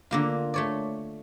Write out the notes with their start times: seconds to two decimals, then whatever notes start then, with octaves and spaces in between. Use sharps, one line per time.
0.11 D3 A#3 F4
0.54 A3 C#5 D5